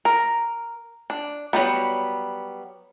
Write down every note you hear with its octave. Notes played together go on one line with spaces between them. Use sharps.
A#4
D4
F#3 G3 B3